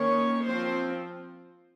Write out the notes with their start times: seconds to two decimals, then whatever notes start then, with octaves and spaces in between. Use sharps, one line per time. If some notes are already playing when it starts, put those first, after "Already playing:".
Already playing: D#3 A#3 C#4 C#5
0.45 F3 C4 C5